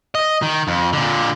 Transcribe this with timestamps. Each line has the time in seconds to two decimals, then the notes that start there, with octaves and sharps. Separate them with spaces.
0.15 D#5
0.43 D#3
0.68 F2
0.93 A#2 D3